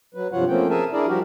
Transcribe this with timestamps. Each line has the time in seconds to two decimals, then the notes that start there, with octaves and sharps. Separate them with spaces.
0.15 F#3 B4
0.32 G2 C3 F3 F4 C#5 F#5
0.48 F3 A3 A#3 C4 C#4 G5
0.70 G#4 A#4 E5 G#5 A5
0.93 D4 E4 G#4 A#4 D5
1.08 F3 G3 F#4 G4 A#4